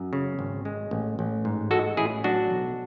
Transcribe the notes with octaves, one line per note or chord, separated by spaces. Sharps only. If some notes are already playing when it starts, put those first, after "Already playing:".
Already playing: F#2
C#3
G#1
G#3
A1
A1
G#2
G#3 F#4 A4
A1 E4 G#4
F#3 D4 F#4
B1